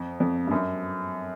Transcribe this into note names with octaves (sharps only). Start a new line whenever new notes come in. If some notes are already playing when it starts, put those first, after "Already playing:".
Already playing: F2
F2
G2
F#2